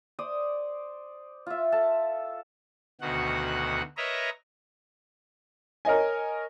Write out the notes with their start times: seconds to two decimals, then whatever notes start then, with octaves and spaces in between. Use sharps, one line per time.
0.19 C5 D5 D#6
1.46 F4 E5
1.72 A4 A5
3.01 D2 B2 D#3 F#4 F#5
3.97 A#4 B4 C#5 D#5 E5 A#5
5.85 A#4 C#5 D#5 G#5